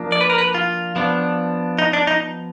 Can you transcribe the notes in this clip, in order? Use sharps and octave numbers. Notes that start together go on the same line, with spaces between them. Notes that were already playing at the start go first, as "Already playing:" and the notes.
Already playing: F3 A#3 D4
D5
B4
A#4
B4
F4
F3 B3 D4
D#4
D4
D#4